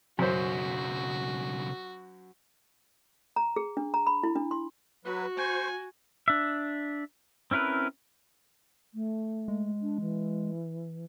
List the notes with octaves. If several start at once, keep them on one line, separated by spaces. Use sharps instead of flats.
B1 F#2 C#3 F#4 C5
A#5
G#4
D4
A#5
B5
E4
D4
C6
F#3 F#4 B4
C5 G#5 C#6
D4 E5
C4 C#4 E4 A#4 B4
A3
G#3
D4
E3